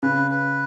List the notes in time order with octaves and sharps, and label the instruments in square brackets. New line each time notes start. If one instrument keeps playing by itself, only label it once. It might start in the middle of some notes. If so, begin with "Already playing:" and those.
[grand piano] C#3 [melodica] B4
[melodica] B4